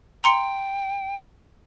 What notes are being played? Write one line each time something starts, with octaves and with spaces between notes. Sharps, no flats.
G5 A#5 C6 C#7